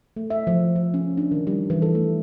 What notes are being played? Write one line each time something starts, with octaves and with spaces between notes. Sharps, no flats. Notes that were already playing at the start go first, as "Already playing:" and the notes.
A3
E5
F3
F3
C#4
D4
D#3
G3
E3
A4
A3